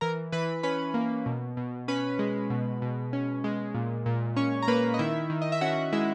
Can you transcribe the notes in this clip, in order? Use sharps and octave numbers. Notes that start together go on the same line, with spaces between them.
E3 A#4 A#5
E3 B4 B5
C#4 B4 B5
A#3
B2
B2
C#4 B4 B5
G#3
B2
B2
C#4
G#3
A#2
A#2
C#4 C#5 C#6
A#5
A#3 B4 B5
D#5
D#3 E4 E5
D#3
D#5
E5
C#4 F#4 F#5
G#3 E4 E5